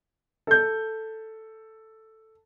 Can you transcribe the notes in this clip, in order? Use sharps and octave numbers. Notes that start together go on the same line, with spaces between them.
A4 G6